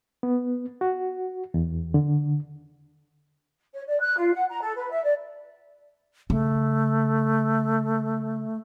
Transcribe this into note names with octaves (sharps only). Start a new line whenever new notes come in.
B3
F#4
E2
D3
C#5
D5
F#6
F4
F#5
A#5
A4
B4
E5
D5
C#3 A3